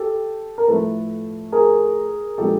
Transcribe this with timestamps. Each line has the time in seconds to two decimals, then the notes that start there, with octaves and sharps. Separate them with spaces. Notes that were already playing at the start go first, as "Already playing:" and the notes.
Already playing: G4 A4
0.58 A#4
0.68 A2 F3 A3 A4 B4
1.52 G#4 A#4
2.38 A#2 F3 G#3 B3 D4 G4 A4